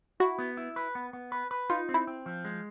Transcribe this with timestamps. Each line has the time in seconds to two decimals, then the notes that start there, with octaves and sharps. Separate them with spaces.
0.20 E4 F#4
0.38 B3
0.57 E4
0.76 B4
0.95 B3
1.13 B3
1.32 B4
1.51 B4
1.70 D#4 F4
1.89 C4
1.94 E4
2.07 C4
2.26 F3
2.45 G#3